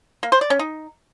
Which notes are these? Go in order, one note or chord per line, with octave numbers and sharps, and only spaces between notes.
A#3
C5
D5
C#4
D#4